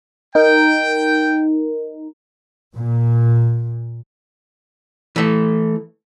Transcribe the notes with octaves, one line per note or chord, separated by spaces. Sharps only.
D#4 A#4 G5
A#2
E3 A3